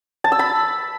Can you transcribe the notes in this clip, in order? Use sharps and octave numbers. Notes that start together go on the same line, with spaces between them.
A5
E6
B5